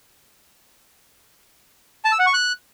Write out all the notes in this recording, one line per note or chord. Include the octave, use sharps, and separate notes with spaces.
A5
E6
F#5
C#6
F#6